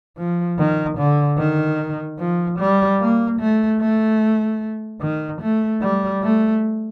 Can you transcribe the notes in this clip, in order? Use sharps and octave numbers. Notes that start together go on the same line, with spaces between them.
F3
D#3
D3
D#3
F3
G3
A#3
A3
A3
D#3
A3
G3
A3